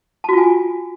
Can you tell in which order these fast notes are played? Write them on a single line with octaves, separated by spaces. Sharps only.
A5 F#4 F4 G#5